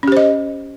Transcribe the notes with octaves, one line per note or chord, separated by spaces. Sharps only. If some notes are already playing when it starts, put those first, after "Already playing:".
C#4 G4 C5 D#5